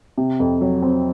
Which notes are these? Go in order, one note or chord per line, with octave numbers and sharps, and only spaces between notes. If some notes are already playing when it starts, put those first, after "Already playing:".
C3
F2
F#3
C4